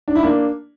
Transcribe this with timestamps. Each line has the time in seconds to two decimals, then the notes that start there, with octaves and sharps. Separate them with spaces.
0.08 D4
0.15 E4
0.23 A#3 D4